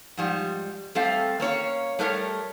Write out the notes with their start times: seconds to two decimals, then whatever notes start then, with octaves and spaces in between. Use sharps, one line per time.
0.17 G#2 F3 G3
0.95 G3 A3 C4 A4 E5 F5
1.40 A#3 C#4 C#5 F5
1.99 G3 A3 A#4 B4 C#5